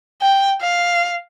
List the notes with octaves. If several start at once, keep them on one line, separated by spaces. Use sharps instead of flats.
G5
F5